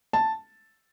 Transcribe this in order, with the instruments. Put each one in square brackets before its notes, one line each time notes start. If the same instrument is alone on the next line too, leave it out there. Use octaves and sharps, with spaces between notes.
[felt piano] A5